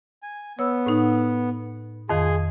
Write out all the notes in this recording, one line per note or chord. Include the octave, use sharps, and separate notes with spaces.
G#5
B3 C#5 E6
A2 D#4 F#5
F2 D#3 G#4 F5 G#5 C6